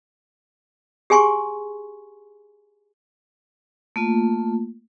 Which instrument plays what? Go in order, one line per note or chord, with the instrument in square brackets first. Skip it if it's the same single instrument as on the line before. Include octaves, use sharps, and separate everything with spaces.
[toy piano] G4 G#4 G#5 C6 C#6
[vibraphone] A3 A#3 F4